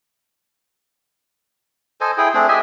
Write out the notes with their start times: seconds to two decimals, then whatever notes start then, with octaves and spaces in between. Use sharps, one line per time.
2.01 A4 C5 D#5 G#5
2.18 E4 G#4 G5
2.34 A3 C4 D4 G#4
2.48 G4 D#5 E5 G#5